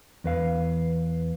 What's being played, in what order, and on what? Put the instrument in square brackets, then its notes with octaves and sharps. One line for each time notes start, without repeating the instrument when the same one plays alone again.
[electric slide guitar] E2 B4 F5